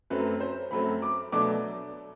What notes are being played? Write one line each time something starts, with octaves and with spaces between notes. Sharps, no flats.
F#2 F#3 A3 C4 B4
C5
F#2 F#3 A3 C4 B5
D6
B2 F#3 A3 D4 D6